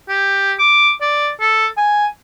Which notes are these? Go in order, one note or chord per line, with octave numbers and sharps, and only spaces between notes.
G4
D6
D5
A4
G#5